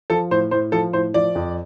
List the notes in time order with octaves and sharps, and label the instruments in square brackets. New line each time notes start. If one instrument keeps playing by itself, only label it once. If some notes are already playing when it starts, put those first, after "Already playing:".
[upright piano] F3 A4
A2 C5
A2 C5
F3 A4
A2 C5
F3 D5
F2